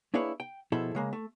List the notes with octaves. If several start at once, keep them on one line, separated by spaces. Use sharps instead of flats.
A#3 D4 E4 G#4 B4 C#5
G5
B2 F3 E4 G#4 A4
C#3 G#3 A#3
A3